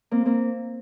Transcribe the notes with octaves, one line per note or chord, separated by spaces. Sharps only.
A#3 C4
A#3 C4